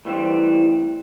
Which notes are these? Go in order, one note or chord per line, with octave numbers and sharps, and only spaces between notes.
A2 E3 G3 C4